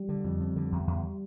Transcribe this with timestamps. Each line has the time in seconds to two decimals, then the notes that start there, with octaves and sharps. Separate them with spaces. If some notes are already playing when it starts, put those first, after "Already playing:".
Already playing: G3
0.09 D3
0.24 F2
0.40 F2
0.56 D3
0.72 E2
0.87 E2